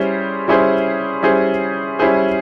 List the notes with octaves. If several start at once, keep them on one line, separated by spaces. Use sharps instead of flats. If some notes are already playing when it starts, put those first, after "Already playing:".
Already playing: G3 C#4 E4 G#4 C5
G3 C#4 E4 G#4 C5
G3 C#4 E4 G#4 C5
G3 C#4 E4 G#4 C5